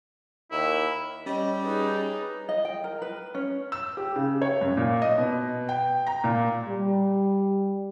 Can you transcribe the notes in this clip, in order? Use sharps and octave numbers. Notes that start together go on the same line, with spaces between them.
D#2 E4
G3 C#4 C#5 D#5
D#4 G#4 B4
D#5
G5
A#4
B4
C#4
E6
G4
C#3
C#5
F#2
A#2
D#5
B2
G5
A#5
A#2
G3